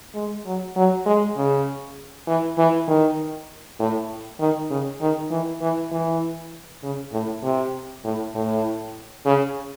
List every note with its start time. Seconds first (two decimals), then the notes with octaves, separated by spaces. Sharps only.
0.15 G#3
0.46 F#3
0.76 F#3
1.06 G#3
1.37 C#3
2.28 E3
2.58 E3
2.88 D#3
3.80 A2
4.40 D#3
4.71 C#3
5.01 D#3
5.31 E3
5.62 E3
5.92 E3
6.83 C#3
7.13 A2
7.43 C3
8.04 A2
8.35 A2
9.26 C#3